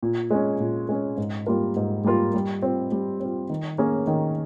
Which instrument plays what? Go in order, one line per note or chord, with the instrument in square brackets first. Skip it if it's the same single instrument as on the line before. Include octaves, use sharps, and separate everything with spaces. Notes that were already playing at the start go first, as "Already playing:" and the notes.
[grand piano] A#2
G#3 C#4
A#2
G#3 C#4
G#2
G3 A#3 F4 A#4
G#2
G3 A#3 F4 A#4
G3
C4 F4
G3
C4 F4
D#3
A#3 C#4 G#4 C#5
D#3